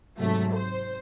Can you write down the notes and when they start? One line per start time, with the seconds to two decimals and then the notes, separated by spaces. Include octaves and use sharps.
0.18 G#2 C3 F#3 A3
0.54 C5